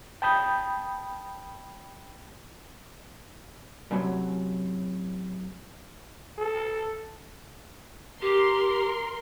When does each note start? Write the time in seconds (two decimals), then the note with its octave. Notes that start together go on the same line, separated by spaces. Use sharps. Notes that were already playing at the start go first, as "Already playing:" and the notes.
0.22 G5 A5 B5 D#6 G6
3.91 F#2 A2 C3 F#3
6.38 A4
8.22 G4 A#4 C6